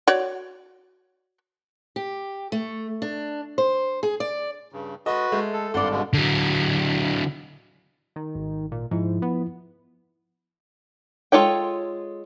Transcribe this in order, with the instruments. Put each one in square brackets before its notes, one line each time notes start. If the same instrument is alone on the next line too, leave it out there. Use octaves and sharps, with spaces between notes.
[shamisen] F#4 C#5 D5
[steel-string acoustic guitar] G4
A3
D4
C5
G#4
D5
[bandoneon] G2 C#3
[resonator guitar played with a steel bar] G#3 A4 [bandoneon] F#4 B4 [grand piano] D#5
[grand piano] G#3 [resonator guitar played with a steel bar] A3
[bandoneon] A4
[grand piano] G#1 G2 [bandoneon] F4 F#5 C6 [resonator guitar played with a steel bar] A4 D5
[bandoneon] B2 D3 G#3
[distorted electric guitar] D3 F#3
[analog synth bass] D#3
[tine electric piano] G#1
[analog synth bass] A#2
[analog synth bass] G#2 [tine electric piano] F3 E4
[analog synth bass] B3
[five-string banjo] G#3 F4 A4 C#5 G5